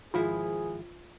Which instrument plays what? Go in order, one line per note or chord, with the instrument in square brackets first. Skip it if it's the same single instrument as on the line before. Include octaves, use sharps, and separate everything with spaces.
[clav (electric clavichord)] G#1 F3 E4 [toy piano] F4 [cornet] G#4